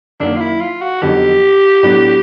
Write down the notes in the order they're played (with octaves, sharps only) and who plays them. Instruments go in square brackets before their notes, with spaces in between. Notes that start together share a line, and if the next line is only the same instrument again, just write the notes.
[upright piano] F#2 D#3 F#3 A#3 [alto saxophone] D4
[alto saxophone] F4
E4
F4
F#4
[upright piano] F2 D3 F#3 B3 D#4 [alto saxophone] G4
[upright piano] A2 F#3 B3 D4